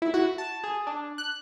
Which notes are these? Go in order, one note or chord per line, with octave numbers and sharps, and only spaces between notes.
E4
F#4
A5
G#4
D4
F#6